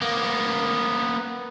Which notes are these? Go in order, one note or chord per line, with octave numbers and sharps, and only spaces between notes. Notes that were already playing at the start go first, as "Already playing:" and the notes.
A#3 B3